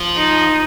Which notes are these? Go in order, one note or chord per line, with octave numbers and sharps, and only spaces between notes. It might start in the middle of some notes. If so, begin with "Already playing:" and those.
Already playing: F3
D#4